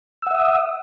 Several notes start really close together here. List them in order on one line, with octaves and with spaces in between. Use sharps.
E6 F#5 E5 D#6